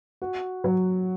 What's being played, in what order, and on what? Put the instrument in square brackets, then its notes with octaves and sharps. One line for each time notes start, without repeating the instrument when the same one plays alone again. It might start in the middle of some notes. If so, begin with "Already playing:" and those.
[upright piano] F#4
F#3